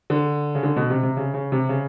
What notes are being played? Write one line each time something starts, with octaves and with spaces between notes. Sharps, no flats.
D3
C#3
D3
B2
C3
C3
C#3
C#3
C3
C#3